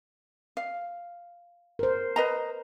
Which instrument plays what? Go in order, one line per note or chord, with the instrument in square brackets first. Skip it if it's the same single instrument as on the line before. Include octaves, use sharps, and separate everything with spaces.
[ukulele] F5
[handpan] A#4 C5
[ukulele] B4 D#5 A#5